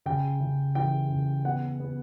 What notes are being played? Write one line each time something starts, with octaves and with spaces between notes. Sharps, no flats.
C#3 G5
C#3
E3 G5
C#3
B3 F#5
B3